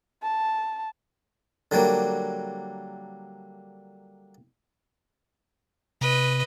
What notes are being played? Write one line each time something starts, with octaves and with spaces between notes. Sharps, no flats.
A5
D3 F#3 G3 A#3
C3 B4 D#5